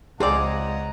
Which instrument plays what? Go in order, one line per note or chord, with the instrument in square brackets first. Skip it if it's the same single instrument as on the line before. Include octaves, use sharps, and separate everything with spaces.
[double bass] C#2 [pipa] F3 C4 D5 [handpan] G#4 [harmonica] D#5 F#5 A#5